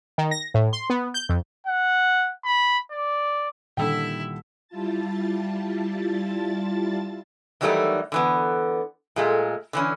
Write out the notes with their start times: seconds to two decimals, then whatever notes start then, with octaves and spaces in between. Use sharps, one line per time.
0.18 D#3
0.31 A#6
0.54 A2
0.73 C6
0.90 B3
1.14 G6
1.29 F2
1.67 F#5
2.45 B5
2.92 D5
3.77 A#2 D3 D#3 G3 E4 A4 E5 G5
4.68 G3 E4 F4 A5 A6
7.61 D#3 E3 F#3 G3 A3 D#4
8.12 D3 E3 B3
9.16 A#2 G#3 A3
9.73 D3 E3 C#4